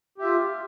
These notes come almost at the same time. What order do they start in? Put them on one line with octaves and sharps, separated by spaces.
G4 E5 F4